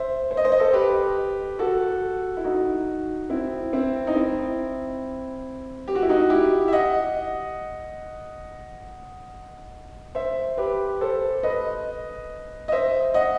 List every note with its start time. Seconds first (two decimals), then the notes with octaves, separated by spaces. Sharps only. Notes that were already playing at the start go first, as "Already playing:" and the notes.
Already playing: C5 E5
0.31 C5
0.37 D#5
0.45 C5
0.52 D#5
0.60 A4 C5
0.73 G4 B4
1.59 F#4 A4
2.37 E4
2.44 D#4 F#4
3.30 C4 E4
3.73 C4 E4
4.07 D#4
4.15 C4 E4
5.88 G4
5.95 F#4
6.02 E4
6.09 D#4 F#4
6.30 E4 G4
6.68 E5
6.73 D#5 F#5
10.15 C5 E5
10.57 G4 B4
11.01 A4 C5
11.43 B4 D#5
12.68 D#5
12.72 C5 E5
13.14 D#5 F#5